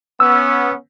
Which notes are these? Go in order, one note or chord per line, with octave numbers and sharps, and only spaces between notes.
B3 C#4 E6